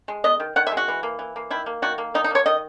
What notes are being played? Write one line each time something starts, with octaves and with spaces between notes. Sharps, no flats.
G#3
B3 D#5
D#3
D#3 F#5
E5
G#3
F#4
E3
A#3
E3
A#3
D#3 E4
A#3
D#3 F#4
A#3
D#3 D#4
D#4
A#3 C#5
D#3 D#5